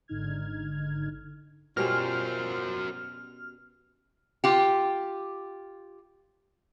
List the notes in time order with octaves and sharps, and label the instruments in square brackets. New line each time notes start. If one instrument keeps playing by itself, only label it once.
[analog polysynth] G#1 G#2 D3 D#4 F6 G#6
[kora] B2 G3 C#4 [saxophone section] F4 C5 [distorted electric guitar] F#4 A#4 [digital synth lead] F6
[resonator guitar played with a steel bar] F4 G4